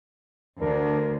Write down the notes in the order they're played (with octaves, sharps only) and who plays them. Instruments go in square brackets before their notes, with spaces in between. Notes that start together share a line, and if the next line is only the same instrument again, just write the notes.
[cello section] D2 [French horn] D4 [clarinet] A#4